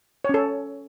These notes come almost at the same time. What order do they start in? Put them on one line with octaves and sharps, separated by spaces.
C#5 C#4 A4